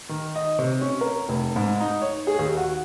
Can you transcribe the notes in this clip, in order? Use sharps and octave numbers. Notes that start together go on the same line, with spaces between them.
D#3
D#5
C3
C#4
A#4
F1
G#2
D#4
C#5
G#4
D#2
F#4